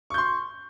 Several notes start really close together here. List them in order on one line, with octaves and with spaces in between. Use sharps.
C#6 G6 C6